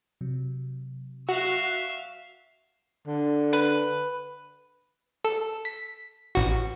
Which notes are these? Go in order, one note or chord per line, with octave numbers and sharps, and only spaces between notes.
C3 F#3
F#4 E5 F5
D3
B4
A4
B6
A1 F#4